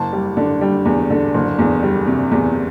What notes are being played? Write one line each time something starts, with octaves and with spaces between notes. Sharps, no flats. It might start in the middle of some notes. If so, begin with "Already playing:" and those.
Already playing: F#1 A5
G3
D3
G3
E2
D3
F#1
E2
G3
C3
E2